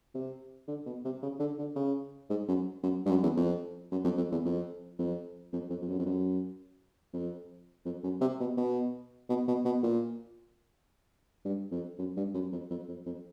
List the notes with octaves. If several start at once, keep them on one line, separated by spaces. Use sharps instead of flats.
C3
D3
B2
C3
C#3
D3
D3
C#3
G#2
F#2
F#2
G2
F#2
E2
F2
F#2
F2
F2
E2
F2
F2
F2
F2
F2
F#2
F2
F#2
F2
F2
F#2
C3
B2
B2
B2
B2
B2
A#2
G2
F2
F#2
G2
F#2
F2
F2
F2
F2